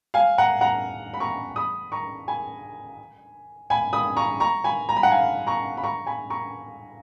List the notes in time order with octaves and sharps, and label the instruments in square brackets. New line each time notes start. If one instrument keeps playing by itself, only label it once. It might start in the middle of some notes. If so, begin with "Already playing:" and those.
[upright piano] F5 G#5
F#5 A#5
F#5 A#5
B5
A#5 C#6
B5 D#6
A#5 C#6
G#5 B5
G#5 B5
B5 D#6
A#5 C#6
A#5 C#6
G#5 B5
A#5
B5
F#5 A#5
F5 G#5
A#5 C#6
B5
A#5 C#6
G#5 B5
A#5 C#6